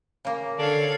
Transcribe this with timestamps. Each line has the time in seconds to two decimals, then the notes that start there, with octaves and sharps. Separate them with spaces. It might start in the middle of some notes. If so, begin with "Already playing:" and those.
0.25 C#3 A#3
0.59 D3 D4 A4 C#5 F5